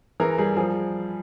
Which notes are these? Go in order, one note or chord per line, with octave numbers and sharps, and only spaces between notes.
E3 G#4 A#4
G3 G#4
F3 G#4